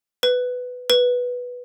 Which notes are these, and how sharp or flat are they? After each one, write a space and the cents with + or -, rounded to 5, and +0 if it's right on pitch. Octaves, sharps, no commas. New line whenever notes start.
B4 +10
B4 -5